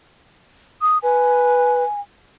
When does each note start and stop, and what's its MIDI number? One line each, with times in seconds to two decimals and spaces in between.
0.81 0.98 87
1.03 1.84 71
1.03 1.99 80